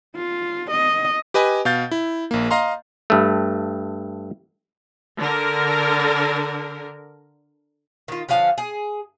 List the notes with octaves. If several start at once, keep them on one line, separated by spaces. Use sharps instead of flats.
F4
D#5
G4 B4 D#5 G#5 B5
B2 F5 G6 A6
E4
A#1 A#3
D#5 F5 A#5 C6
G2 A3
D3 A#4
D#3 F4
D3 F3 C#4 F5
G#4